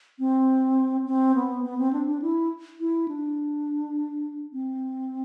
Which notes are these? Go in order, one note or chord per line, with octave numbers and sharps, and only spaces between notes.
C4
C4
B3
B3
C4
D4
D4
E4
E4
D4
C4